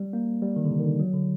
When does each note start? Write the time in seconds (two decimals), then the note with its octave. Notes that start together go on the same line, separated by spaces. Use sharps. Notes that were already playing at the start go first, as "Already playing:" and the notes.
Already playing: G3
0.13 A#3
0.42 G3
0.56 D#3
0.64 D3
0.71 C3
0.80 D#3
0.85 D3
1.00 F#3
1.13 D3